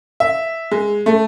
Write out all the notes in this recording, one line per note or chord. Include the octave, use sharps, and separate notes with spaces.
E5
G#3
A3